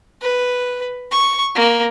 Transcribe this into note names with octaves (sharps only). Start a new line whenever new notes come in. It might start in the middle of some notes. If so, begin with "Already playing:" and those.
B4
C#6
A#3